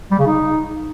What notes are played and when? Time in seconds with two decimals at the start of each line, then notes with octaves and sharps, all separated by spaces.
0.11 G3
0.19 C#3
0.27 D#4